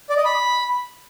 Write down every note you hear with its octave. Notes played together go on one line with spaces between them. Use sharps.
D5
D#5
B5